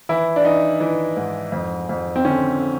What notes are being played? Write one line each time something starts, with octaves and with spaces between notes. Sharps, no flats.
E3 E4
D4
E3 D#4
E3
G#2
F2
F2
C4
D3 C#4